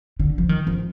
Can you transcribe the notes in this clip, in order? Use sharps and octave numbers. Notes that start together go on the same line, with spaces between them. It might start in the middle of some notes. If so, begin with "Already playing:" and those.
D3
F3
D#3
F3